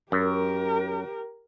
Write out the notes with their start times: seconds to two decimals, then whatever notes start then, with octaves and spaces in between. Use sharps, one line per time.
0.12 F#2 G4 A#4